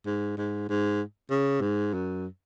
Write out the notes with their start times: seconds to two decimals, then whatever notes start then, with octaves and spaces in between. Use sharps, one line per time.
0.06 G#2
0.38 G#2
0.69 G#2
1.30 C#3
1.61 G#2
1.94 F#2